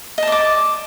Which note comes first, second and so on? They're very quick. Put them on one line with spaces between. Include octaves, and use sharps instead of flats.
D#5 A5 D5 D6